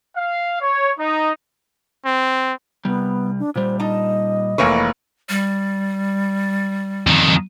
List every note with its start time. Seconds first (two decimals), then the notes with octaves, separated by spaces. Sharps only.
0.16 F5
0.60 C#5
0.99 D#4
2.05 C4
2.85 C2 G3 B3
3.39 D4
3.56 A#2 G3 C5
3.80 D#4 D#5 A5
4.58 F1 E3 A#3 B4 C#5 C#6
5.29 G3
7.07 F2 D#3